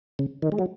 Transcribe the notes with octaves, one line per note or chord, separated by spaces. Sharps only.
C#3
D#3
G#3
F#3